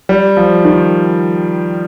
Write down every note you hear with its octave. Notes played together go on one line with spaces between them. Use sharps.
G3
F3
D#3